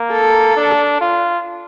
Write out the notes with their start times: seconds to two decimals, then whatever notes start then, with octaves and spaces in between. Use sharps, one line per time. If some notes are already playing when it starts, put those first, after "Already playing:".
Already playing: A#3
0.12 A4
0.56 D4
1.01 F4